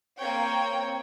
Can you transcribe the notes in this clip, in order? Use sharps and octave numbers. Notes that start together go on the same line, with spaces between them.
A#3 C4 C#5 G5